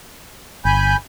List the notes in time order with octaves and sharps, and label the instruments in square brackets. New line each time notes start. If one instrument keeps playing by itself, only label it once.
[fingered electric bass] G1 [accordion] G#5 B5 G6